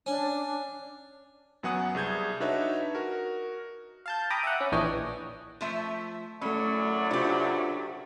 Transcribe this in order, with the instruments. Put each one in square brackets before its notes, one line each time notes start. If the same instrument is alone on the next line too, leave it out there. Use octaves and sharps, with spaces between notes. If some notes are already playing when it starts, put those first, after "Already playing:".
[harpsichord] C#4 [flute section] D4
[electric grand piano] F#2 F#3 B3 F#5 G#5 D#6
C2 G#4 G6 G#6
D4 D#4 F#4 B4 C#5 E5
F#4 A#4
[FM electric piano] F5 A5 G6
G5 A#5 B5 D6 D#6
E5 F#5
C#4
A#1 E3 D4 C#5 D#5 G5
[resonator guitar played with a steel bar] F3 A3 E5
[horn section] F#2 A2 F#3 [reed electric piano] A3 B5 [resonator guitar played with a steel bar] C#4 [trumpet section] D5
[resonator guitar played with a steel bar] C3 G4 [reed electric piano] D4 F4 C5